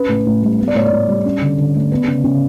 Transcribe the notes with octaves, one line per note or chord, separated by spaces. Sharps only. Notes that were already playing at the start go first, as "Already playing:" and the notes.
Already playing: C#4 B4
A2
A2
G3
B3
D5
A2 C#5
D5
A2
G3
C#4
D3
D3
A3
B3
C#3
C#3